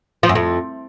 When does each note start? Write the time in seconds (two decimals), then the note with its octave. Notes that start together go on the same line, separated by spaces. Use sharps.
0.23 F3
0.29 F#2
0.35 F2